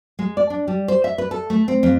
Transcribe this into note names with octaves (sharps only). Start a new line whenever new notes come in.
G#3
D5
D4
G3
C5
E5
B4
A4
A3
C4
F2